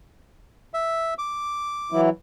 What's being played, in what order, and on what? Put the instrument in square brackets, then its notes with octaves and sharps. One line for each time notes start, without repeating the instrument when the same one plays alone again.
[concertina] E5
D6
[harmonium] E3 F#3 E4